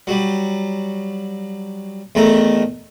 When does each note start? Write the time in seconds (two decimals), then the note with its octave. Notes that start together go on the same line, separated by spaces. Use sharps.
0.07 F#3 G3
2.15 E2 D#3 A3 A#5